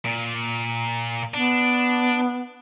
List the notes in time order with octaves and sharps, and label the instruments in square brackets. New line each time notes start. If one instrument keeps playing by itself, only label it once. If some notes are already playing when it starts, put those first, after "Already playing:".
[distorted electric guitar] A#2
[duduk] B3 [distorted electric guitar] D4